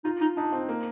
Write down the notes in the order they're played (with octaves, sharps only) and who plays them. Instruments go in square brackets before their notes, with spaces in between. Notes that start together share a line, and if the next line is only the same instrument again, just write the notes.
[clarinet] D#4 [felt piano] F4
[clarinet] D#4
[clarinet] D4 [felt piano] D#4
[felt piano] C4
A#3